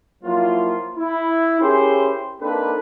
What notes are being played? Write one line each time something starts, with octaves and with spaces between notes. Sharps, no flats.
F3 F#3 A#3 E4 F4
E4
C#4 E4 G4 G#4 A#4 C5
A#3 C4 D4 D#4 A4 B4